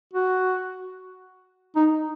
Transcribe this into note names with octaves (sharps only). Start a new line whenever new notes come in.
F#4
D#4